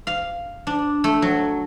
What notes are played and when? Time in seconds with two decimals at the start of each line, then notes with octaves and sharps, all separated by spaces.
0.07 F5
0.67 D4
1.04 A3
1.22 F#3